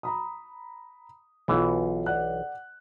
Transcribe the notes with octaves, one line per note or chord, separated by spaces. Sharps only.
A#5 B5 D#6
B1 B2 E3 F4
D5 F#5 F#6